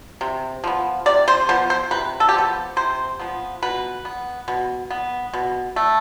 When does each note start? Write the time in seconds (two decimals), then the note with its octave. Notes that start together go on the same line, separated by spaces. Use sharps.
0.21 C3
0.64 F3 B3
1.06 C3 D5
1.28 C5
1.49 F3 B3 C5
1.70 C5
1.91 C3 B4
2.20 A4
2.29 G4
2.34 F3 B3 A4
2.76 C3 C5
3.20 F3 B3
3.63 B2 B4
4.05 B3
4.48 B2
4.91 B3
5.34 B2
5.76 A3